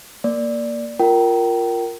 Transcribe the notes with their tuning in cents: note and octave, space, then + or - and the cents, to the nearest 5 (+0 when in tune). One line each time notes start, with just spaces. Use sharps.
A#3 +0 D5 +0
F4 +0 A#4 +0 G5 -25